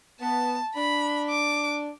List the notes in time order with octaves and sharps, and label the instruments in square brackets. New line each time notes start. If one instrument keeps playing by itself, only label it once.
[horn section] B3 [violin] A5
[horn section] D4 [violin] B5
[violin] D6